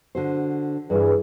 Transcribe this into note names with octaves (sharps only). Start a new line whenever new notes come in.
D3 F#4 C5
G2 E3 G#4